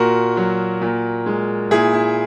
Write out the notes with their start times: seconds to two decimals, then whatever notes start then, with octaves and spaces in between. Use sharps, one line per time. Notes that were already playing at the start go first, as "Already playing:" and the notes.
Already playing: A#2 F#4 A#4
0.37 F#3
0.81 A#2
1.26 G#3
1.71 A#2 E4 G#4
1.93 E4